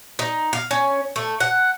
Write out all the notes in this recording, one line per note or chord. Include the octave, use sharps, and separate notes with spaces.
D#4
F5
C#4
A3
F#5